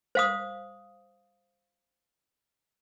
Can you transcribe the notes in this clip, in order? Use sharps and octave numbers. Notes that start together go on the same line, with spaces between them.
C5 F5 D#6